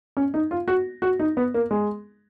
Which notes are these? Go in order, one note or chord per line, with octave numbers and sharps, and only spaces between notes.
C#4
D#4
F4
F#4
F#4
D#4
B3
A#3
G#3